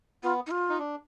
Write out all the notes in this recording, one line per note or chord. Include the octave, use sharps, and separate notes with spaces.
B3 F4
D#4
F4
D#4
D4